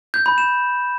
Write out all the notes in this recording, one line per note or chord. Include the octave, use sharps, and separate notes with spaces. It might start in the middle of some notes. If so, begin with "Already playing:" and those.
G6
B5
E7